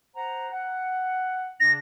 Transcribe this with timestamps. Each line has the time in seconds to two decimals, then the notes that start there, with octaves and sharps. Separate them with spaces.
0.16 C5 F#5 A#5
0.51 F#5
1.60 C#3 D4 A#6